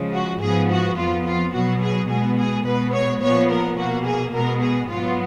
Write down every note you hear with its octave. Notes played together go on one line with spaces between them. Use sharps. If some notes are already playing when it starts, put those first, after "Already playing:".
Already playing: C#3 F3 G#3
F#4
G#2 F3 B3 G#4
F#4
F2 F3 B3 F4
F4
B2 F#3 B3 F#4
G#4
B2 G#3 B3 G#4
G#4
B2 G#3 B3 B4
C#5
A#2 F3 B3 C#5
A#4
B2 A#3 F#4
G#4
B2 G#3 B3 A#4
G#4
G#2 F#3 B3 F4